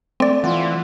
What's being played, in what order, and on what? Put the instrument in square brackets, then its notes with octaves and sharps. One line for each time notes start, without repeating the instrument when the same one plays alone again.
[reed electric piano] A3 [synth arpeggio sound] C4 D5
[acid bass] E3 [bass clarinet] F4 [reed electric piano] F#5